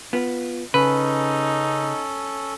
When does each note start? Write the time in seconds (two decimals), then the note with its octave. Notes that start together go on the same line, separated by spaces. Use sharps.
0.13 B3 F4
0.74 C#3 C#4 D#4 A4 B4